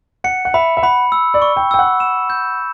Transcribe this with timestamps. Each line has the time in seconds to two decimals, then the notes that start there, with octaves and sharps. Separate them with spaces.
0.24 F#5 C#7
0.45 F#5
0.54 E5 B5
0.77 E5
0.83 F#5 B5
1.12 E6
1.34 D5
1.42 C#6
1.57 G5
1.71 G5 E6
1.79 F#5
2.00 E7
2.30 G6